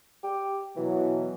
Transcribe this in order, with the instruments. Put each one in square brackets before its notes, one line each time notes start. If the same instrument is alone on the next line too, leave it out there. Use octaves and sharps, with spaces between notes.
[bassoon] G4
[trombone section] B2 F#3 [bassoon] E3